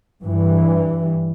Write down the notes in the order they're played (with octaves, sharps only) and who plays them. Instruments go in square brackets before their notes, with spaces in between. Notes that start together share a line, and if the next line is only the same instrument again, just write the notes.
[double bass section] G2 E3